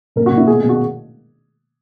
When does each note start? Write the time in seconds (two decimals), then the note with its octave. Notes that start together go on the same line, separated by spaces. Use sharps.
0.16 A#2 A#4
0.26 F#4
0.32 A#2
0.38 E4
0.47 B2 G#4
0.58 G#4
0.64 B2
0.69 F#4